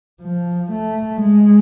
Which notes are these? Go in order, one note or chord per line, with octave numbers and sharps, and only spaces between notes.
F3
A3
G#3